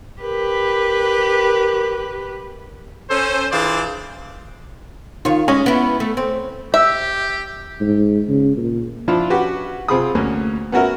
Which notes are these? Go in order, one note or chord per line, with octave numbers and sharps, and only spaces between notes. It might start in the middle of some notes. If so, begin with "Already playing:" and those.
G4 A#4 B4
C#4 A4 C5
E3 D4 F4 G#4 C5 D5
D#3 F4 C#5
G#3 C#4
B3 E4
A3
C4
G4 E5
G#2
C#3
A#2
F3 D4 E4 F4
C#4 F#4 G4 B4
C3 C4 F4 G#4 B5 D#6
D2 A#3 C#4
B3 C#4 F#4 A#4 E5